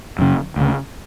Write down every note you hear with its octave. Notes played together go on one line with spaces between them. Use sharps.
F#2 C#3
D2 C#3